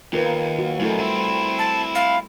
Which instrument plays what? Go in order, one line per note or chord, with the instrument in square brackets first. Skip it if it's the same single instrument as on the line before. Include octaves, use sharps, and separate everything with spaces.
[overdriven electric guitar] D#2 [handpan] F4 A#4 B4
[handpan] F#4
[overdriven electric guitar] F#2 D#3 [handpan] A3 E4 A4
[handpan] G3 [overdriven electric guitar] C4 E4
[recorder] A5
F5